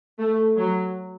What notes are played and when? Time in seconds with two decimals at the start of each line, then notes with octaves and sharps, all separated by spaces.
0.19 A3
0.58 F#3